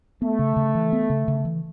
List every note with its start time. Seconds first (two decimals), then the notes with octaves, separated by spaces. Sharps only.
0.22 A3 B3
0.39 C#3
0.57 C#3
0.75 E3
0.93 B3
1.10 C#3
1.28 C#3
1.45 E3